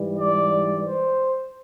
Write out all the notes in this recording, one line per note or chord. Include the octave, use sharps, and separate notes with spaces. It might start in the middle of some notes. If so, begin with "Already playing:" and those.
Already playing: G#2 E3 G3
D5
C5